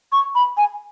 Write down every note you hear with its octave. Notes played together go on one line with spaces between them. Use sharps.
C#6
B5
G#5